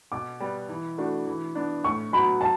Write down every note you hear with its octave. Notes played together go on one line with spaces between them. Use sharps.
B2 D6
G3 B3
E3
A3 D4 F#4
E3
B3 D4
A2 C#6
F#3 B3 F#4 B5
F#3 A5